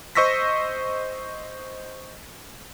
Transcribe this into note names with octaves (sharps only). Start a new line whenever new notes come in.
C5 D#5 C#6 E6 A#6 B6